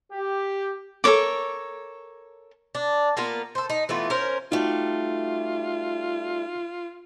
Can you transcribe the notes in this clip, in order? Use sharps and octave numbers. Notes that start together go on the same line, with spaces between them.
G4
A4 A#4 C#5 D6
D4
A#3 B3 F4 A#4
A4 C5
D#4
E3 A3 B3 F4
C#4 A#4 C5
G3 A3 D#4 F4 F#4